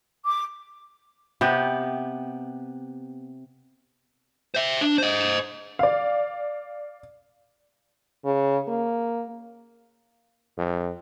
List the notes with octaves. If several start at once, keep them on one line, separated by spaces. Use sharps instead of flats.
D6
C3 B3 G4
C5 E5
D4
C5 D#5
D5 F5
C#3
A#3
F2